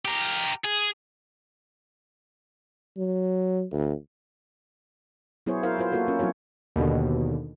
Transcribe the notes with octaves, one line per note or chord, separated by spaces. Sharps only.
G4 A#4
G#4
F#3
D2
F#3 B3 E4 G#4 C5 C#5
E4 F#4 A#4 C5 F5
F4 B4 C5
A#3 F4 F#4 A4 A#4
C#4 F4 A#4
F#3 C4 E4 F#4 C#5
D#2 B2 D3